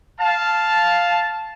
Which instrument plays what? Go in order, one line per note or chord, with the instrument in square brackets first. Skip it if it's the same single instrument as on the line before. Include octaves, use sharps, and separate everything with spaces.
[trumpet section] F5 A5